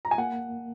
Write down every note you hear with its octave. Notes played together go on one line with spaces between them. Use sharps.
A#5
G#5
A#3 F#5